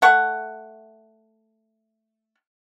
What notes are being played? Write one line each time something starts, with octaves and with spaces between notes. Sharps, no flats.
A3 F#5 C#6